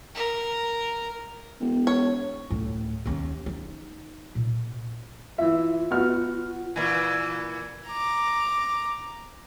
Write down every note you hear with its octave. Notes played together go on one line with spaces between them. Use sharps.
A#4
E1
C#5
D2 A2
D#2 C#4
D#4
A#2
E3 F4 E5
B3 F#4 F6
A#2 E3
A#5 D6